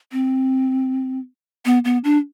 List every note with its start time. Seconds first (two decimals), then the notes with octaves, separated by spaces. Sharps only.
0.12 C4
1.65 B3
1.85 B3
2.04 D4